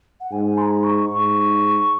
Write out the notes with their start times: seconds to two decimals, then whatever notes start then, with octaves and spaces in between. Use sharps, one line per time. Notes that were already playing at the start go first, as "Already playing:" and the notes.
0.20 F#5
0.31 G#2 G#5
0.57 C6
0.62 A#5
0.83 C#6
1.09 G#2 C#6